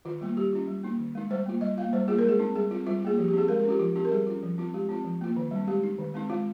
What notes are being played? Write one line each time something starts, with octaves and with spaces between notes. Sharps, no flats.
D#3 F4
G3 A#3 F4
G3 G4
C#4 F4
G3
A#3 D#4
D#3
G#3 D#4
G3 C5
A#3 F4
G3 D#5
A#3 F4 F5
G3 C5
A#3 F4 G#4
A#4
G#3 G#4
C4 D#4
G3 G#4
C4 F4
G3 F4
A#3 F4 G#4
F3 G4
G4
C4 D#4 G#4
G#3 A#4
A#4
C#4 F4 G4
F3 F4
C4 D#4 G4
A#4
G3 G#4
C#4 F4
F3
C4 F4
G#3 G4
C4 F4
F3
A#3 F4
D#3
G3 C4
G#3 G4
D#4
D#3
G#3 C4 D#4
G#3 F4